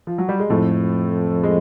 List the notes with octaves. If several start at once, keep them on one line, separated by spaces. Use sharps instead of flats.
F3
F#3
G3
G#3
F2 A2 A3
G#3